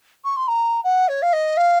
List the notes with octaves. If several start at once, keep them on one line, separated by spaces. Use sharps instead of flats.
C#6
C6
A#5
F#5
C#5
F5
D#5
F5